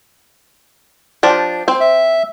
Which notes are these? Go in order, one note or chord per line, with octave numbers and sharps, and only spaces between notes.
F3 D4 G4
C4 C5
E5